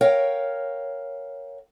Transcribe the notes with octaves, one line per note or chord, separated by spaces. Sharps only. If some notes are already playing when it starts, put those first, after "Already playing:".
A#4 C#5 F5 G5